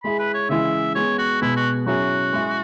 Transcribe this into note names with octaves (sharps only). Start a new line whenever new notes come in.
G#3 E4 G#4 B5
B4
C#5
C#3 E3 G#3 E4 G#4 E5
G#3 B3 G#4 C#5
F#4
B2 G#3 B3 E4
F#4
F#3 C#4 E4 F#4 G#4
G#3 E4 G#4